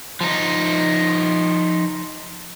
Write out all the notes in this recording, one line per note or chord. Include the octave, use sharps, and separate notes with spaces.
F3 D#4